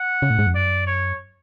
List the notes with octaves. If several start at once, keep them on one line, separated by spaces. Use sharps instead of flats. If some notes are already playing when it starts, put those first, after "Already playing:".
Already playing: F#5
C#3
A2
G#2
F2
F#2 D5
C#5